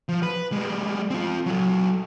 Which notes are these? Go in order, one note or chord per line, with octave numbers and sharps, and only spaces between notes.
F3
B4
G3 G#3
C4 F4
F#3 A4